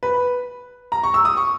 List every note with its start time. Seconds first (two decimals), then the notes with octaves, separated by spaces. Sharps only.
0.03 B4
0.92 A#5
1.04 C#6
1.14 E6
1.25 D#6
1.37 C#6